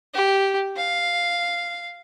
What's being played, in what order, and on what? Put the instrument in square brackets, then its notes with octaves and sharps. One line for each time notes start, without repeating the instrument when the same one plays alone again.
[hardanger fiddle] G4
F5